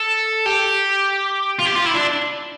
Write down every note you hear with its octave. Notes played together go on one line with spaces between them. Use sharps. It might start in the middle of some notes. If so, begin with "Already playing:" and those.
Already playing: A4
G4
F4
G4
F4
E4
D4